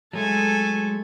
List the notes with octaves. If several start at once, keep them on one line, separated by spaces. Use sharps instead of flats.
F#3 G#3 A3 A4 G#5